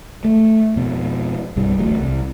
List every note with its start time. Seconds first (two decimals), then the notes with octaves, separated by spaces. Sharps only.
0.25 A3
0.76 F2 B2
1.56 B1 G2 G3
1.78 D1 A1 D2 F#3
1.99 C2